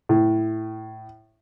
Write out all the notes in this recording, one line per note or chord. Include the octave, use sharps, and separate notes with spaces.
A2